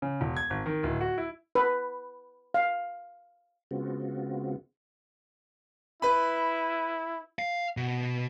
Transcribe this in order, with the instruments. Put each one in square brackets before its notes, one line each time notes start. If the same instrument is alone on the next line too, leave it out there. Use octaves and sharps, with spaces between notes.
[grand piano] C#3
E1
G#6
G#1
D#3
D1
F#4
E4
[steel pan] B4
F5
[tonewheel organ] C#3 G#3 B3 C4 F4 F#4
[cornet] E4 [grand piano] B4 B5
[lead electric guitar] F5
B2